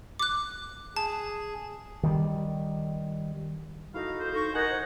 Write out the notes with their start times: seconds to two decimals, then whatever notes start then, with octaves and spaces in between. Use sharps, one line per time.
0.19 D6 F#6
0.96 G#4 A5
2.03 D#3 G3
3.94 D#4 E4 F#4 A4 F5
4.19 A4 C5
4.34 D#4 C#6 A#6
4.54 D#4 A#4 F#5 G#5 G6 G#6
4.70 C5